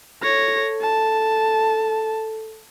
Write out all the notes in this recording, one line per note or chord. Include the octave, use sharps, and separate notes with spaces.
A4 C#5 A#6
A5